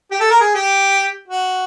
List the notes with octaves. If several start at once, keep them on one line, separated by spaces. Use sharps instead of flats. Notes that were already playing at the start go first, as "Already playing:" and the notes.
G4
A4
A#4
G#4
G4
F#4